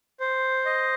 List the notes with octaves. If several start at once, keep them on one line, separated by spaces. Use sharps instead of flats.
C5
D#5